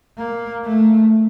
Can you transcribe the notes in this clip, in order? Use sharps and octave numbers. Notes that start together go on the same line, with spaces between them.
A#3
A3